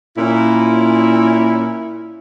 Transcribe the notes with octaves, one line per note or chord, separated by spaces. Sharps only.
A#2 C#4 E4